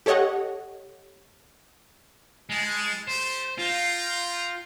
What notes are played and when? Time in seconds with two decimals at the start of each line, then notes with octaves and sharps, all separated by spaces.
0.06 G4 A4 C#5 D#5 F#5
2.50 G#3 E4 A5
3.08 A3 G4 C5
3.58 D#4 F4 G5 A#5